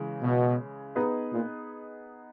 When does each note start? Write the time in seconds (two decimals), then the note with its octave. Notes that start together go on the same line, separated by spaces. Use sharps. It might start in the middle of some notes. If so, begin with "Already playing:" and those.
Already playing: C#3 E3 G#3
0.22 B2
0.95 B3 D#4 G#4 B4 D#5
1.32 A#2